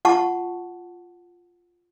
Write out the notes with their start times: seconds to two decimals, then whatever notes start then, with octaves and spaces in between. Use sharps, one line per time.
0.05 F4 F#5 A5 C#6